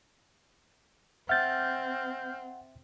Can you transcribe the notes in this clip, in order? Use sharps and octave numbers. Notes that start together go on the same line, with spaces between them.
C4 E5 F#5 F6 G6 A6